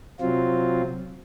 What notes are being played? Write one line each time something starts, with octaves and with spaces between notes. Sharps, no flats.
C3 F#3 C4 F4